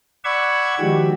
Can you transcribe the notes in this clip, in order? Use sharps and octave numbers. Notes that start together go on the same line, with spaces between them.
D5 F#5 B5 C#6 E6 G#6
D#3 F3 G#3 F#4 G4